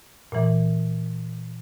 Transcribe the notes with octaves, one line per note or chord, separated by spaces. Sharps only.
A#2 E3